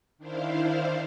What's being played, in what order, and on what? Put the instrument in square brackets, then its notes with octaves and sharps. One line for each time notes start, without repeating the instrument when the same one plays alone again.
[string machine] D#3 D4 E4 C5 F5